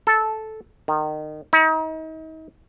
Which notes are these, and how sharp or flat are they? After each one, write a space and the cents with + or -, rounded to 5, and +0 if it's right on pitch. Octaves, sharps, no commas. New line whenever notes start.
A4 -10
D#3 -25
D#4 +35